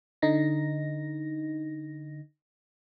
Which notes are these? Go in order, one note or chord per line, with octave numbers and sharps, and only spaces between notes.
D3 D#4 A#6